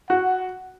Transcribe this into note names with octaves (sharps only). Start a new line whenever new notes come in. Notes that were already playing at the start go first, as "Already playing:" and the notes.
F#4 F#5